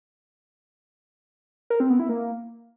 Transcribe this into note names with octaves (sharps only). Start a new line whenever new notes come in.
A#4
C4
B3
E4
A#3